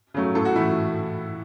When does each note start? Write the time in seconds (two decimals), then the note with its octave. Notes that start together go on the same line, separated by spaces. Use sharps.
0.14 C#3 F#3 A3
0.35 A2 A4
0.45 F#4
0.56 E3 A3 E4